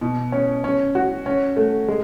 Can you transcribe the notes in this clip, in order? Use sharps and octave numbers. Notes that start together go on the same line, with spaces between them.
B2
C#4
C#4
F#4
C#4
A3
G#3